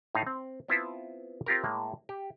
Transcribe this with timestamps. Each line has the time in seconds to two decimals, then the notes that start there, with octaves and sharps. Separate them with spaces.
0.15 A2 A3 D#4 F5
0.27 C4
0.68 B3 C4 E4 F4 B4 A5
1.46 C4 F4 G4 A#4
1.64 A2 G#3 A#3
2.09 G4